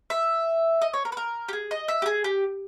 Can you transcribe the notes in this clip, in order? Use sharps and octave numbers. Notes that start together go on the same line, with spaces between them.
E5
D#5
C#5
A#4
B4
A#4
G4
G#4
D#5
E5
G4
G#4
G4